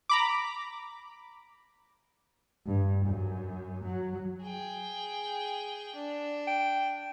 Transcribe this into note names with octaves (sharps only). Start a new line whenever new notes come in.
A#5 B5 D6
G2
F#2
F#3
G#4 G5
D4
G5